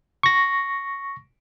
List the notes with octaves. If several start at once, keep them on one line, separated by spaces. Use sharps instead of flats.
C#6 A#6